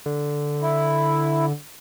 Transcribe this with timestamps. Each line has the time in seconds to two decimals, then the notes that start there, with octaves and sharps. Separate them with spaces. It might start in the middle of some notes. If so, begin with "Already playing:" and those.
0.06 D3
0.62 E4